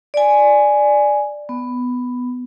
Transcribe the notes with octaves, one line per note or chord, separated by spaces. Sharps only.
D5 G#5
B3